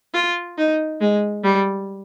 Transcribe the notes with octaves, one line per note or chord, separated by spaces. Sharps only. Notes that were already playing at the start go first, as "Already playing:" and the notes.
F4
D#4
G#3
G3